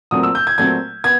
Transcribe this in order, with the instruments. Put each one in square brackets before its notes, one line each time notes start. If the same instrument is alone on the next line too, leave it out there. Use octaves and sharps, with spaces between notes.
[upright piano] A#2 F#3 A3 C4 D#6
E6
G6
G#6
A#2 F#3 A3 C4 G#6
B3 G#6